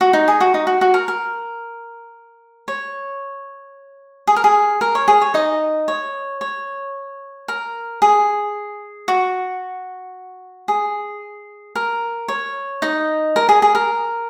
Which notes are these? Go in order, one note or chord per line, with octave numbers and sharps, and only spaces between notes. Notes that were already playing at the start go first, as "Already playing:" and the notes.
F#4
D#4
G#4
F#4
D#4
F#4
F#4
A#4
A#4
C#5
G#4
A#4
G#4
A#4
C#5
G#4
C#5
D#4 D#5
C#5
C#5
A#4
G#4
F#4
G#4
A#4
C#5
D#4 D#5
A#4
G#4
G#4
A#4